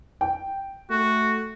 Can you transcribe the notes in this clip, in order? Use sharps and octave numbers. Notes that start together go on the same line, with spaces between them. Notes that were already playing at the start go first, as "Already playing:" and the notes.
G5
A3 F#4